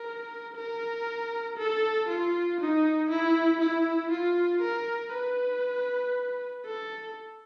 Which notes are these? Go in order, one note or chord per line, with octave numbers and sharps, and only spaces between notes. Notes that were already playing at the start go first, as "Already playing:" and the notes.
Already playing: A#4
A#4
A4
F4
D#4
E4
E4
F4
A#4
B4
A4